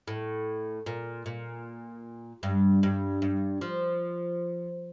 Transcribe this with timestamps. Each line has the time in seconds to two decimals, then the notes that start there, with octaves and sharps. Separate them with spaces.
0.08 A2
0.86 A#2
1.26 A#2
2.43 G2
2.83 G2
3.22 G2
3.61 F3